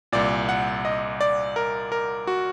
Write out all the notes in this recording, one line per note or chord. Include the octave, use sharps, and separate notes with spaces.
C2 A#2 D5
F#5
D#5
D5
A#4
A#4
F#4